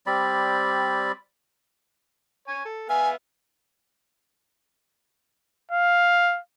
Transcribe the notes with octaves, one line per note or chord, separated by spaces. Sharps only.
G3 C4 D5 B5
C#5 G#5
A4
B3 E5 F5 G#5
F5